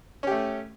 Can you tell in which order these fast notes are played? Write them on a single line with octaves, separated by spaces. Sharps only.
C#4 G4 A3